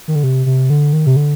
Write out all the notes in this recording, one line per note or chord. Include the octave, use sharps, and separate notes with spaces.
D#3
D3
C3
C3
D3
D#3
C3
D3